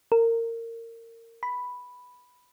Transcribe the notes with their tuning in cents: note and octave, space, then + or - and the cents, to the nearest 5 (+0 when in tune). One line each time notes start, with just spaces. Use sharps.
A#4 -25
B5 +0